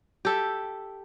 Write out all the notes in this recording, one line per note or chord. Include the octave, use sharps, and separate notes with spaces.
G4 A4 E5